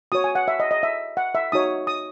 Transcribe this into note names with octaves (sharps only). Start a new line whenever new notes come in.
F#4 C#5 D#6
G#5
F#5
E5
D#5
D#5
E5
F#5
E5
D#4 F#4 C#5 D#6
D#6